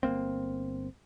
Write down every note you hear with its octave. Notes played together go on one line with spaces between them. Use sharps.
G1 F#2 A#3 C4